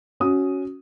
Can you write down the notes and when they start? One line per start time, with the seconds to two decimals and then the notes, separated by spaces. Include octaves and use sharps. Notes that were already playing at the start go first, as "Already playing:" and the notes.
0.20 C#4 F#4 D#6